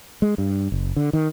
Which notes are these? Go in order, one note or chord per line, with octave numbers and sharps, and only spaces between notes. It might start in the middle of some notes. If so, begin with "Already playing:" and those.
G#3
G2
F#1
D3
D#3